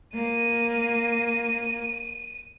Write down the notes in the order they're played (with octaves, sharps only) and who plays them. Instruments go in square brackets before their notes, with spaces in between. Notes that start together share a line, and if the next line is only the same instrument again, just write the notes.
[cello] A#3 [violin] D#7